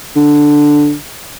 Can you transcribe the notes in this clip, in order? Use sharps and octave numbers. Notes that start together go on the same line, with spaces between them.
D3